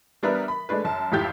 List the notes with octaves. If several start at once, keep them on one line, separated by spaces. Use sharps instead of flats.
G3 B3 D4 A#4 B4 E5
B5
G#3 A3 D4 B4
F#2 A5
G#1 F2 E4 G4 G6 A6